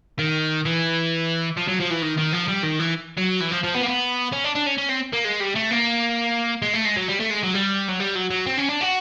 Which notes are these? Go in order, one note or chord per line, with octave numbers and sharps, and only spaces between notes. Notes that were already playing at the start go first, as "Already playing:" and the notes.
D#3
E3
F3
F#3
F3
E3
D#3
D#3
F3
G3
D#3
E3
F#3
E3
F3
F3
B3
A#3
B3
C#4
D4
D4
C#4
C#4
C4
A#3
G#3
G3
A3
A#3
G#3
A3
G#3
F#3
G3
A3
G#3
F#3
G3
F#3
G3
F#3
F#3
C4
C#4
D4
F#4